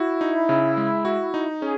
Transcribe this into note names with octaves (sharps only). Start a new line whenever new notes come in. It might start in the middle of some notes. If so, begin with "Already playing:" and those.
Already playing: E4 F#4
D#4
C#3
G#3
F#4
D#4
C#4 G#4